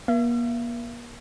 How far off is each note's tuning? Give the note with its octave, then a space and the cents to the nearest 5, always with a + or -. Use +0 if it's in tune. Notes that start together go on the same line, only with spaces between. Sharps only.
A#3 +40 E5 +45